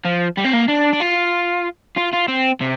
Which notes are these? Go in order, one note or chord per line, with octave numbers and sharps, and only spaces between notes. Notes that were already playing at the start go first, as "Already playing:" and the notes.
F3
G3
C4
A#3
D4
D4
F4
F4
F4
C4
C3